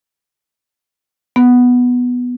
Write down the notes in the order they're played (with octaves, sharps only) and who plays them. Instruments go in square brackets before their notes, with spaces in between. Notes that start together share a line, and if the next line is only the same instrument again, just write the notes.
[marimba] B3